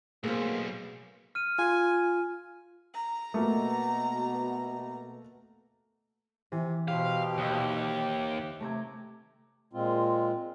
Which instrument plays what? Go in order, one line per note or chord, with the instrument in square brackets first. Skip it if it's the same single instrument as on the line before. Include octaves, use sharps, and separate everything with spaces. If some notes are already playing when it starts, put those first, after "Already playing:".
[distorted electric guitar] B1 [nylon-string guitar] A#3 C5 [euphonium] G#4
[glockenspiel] F6 D#7
[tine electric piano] F4 [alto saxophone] G#5
[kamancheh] A#5
[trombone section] B2 [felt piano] A3 A#3
[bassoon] C3 [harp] E3
[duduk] B2 [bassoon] G4 [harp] B4 C5 [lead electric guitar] F5
[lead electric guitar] D#2 [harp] D#4 D#5 E5
[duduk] C3 [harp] A3 A#5 G#6
[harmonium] A#2 G#3 C4 F4